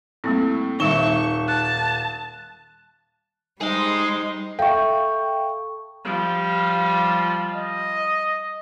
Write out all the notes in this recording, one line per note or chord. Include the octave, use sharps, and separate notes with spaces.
A2 G3 A#3 C4
D#1 D#3 G3 D#4 E5 C#6 E7 G7
A5 F#6
G3 D#4 G#4 C5 D#5
A4 E5 F5 G5 C#6
F3 G3
D#5